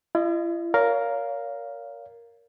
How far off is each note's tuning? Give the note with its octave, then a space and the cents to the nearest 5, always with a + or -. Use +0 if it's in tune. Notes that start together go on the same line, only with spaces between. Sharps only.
E4 +45 D#5 -15
A#4 +0 C#5 +35 F5 +0